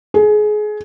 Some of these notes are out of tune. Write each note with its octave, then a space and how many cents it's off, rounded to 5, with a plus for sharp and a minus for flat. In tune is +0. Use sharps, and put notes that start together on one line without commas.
G#4 +25